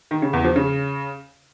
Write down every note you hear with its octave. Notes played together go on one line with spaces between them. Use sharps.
D#3
C#3
E2
F3
C#3